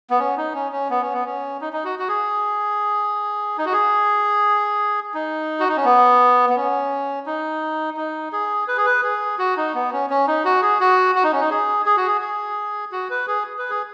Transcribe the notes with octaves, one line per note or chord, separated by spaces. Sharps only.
B3
C#4
D#4
C#4
C#4
B3
C#4
B3
C#4
D#4
D#4
F#4
F#4
G#4
D#4
F#4
G#4
D#4
F#4
D#4
C#4
B3
B3
C#4
D#4
D#4
G#4
B4
G#4
B4
G#4
F#4
D#4
B3
C#4
C#4
D#4
F#4
G#4
F#4
F#4
D#4
C#4
D#4
G#4
G#4
F#4
G#4
G#4
F#4
B4
G#4
B4
G#4